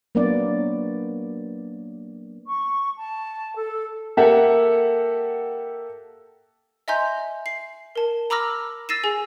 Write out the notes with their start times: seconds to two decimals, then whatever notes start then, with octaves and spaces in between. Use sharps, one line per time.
0.15 F#3 A#3 B3 D4 D5
2.46 C#6
2.97 A5
3.56 A4
4.17 A#3 G4 A4 E5 F#5
6.88 D#5 E5 G#5 A#5 C6 G6
7.46 C7
7.96 A#4 A5
8.30 A#5 B5 D6 E6 F6 A#6
8.89 E6 A6 A#6 C7 D#7 E7
9.04 G#4 G#5